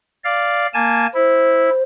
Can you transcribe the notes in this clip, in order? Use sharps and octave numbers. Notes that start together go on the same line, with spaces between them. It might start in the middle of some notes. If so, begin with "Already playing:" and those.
D5 F5
A#3 G#5 A5
E4 C5